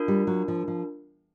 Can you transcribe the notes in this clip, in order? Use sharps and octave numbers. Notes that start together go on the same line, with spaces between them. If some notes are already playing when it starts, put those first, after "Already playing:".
Already playing: D4 F4 A#4
G3
F#3
F3
F3